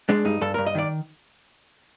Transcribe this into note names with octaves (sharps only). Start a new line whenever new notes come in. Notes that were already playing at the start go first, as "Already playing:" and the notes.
G#3 D4
G2 D#4
G2 A4
G2 A#4
D#5
D#3 D5